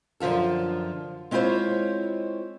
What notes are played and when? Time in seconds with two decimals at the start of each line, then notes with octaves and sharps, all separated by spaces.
0.20 F#2 D3 F3 F4 A4
1.31 G#3 C4 E4 F4 C5 C#5